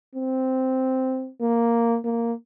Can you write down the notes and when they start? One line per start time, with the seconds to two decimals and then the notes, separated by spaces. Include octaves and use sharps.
0.15 C4
1.41 A#3
2.05 A#3